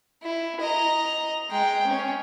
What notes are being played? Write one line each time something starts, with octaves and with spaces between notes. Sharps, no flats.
E4
D#5 A#5
G#3 G5
C#4